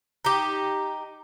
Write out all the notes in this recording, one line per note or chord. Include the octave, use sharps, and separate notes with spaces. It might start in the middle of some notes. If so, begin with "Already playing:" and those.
D#4 G4